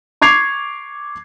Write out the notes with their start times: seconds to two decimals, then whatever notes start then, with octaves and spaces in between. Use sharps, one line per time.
0.22 C#6 D6 G#6 C7 F7